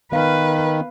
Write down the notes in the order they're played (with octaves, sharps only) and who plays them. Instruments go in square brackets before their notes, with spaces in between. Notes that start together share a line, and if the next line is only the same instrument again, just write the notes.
[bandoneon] D#3 [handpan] B3 F5 [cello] B4